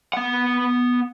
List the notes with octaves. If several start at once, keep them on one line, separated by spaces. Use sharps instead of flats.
B3 F#5